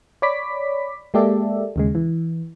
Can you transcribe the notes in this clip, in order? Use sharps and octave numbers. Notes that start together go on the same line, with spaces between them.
C#5 D5 B5 D6 B6
G#3 A#3 G4 A4 D5 E5
D#2 C#3 G#3
E3